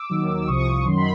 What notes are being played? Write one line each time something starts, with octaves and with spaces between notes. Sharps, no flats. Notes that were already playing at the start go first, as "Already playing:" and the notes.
Already playing: D6 E6
D#2 D#3 F#3
E6
C2 C3 F3 C#6 D#6
F#2 D#3 F#3 C6
B5